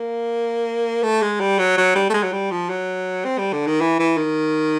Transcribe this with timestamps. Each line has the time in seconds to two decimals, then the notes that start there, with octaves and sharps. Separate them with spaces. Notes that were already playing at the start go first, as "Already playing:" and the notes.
Already playing: A#3
1.03 A3
1.22 G#3
1.40 G3
1.59 F#3
1.77 F#3
1.95 G3
2.10 A3
2.14 G#3
2.23 F#3
2.32 G3
2.51 F3
2.70 F#3
3.25 C4
3.38 G3
3.53 D3
3.67 D#3
3.81 E3
3.99 E3
4.17 D#3